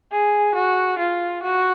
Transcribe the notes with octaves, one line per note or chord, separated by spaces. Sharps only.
G#4
F#4
F4
F#4